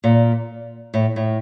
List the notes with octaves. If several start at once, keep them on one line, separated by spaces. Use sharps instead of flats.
A#2
A2
A2